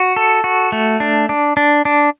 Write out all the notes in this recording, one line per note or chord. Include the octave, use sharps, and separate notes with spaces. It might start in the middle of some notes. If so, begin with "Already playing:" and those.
Already playing: F#4
A4
F#4
A3
D4
D4
D4
D4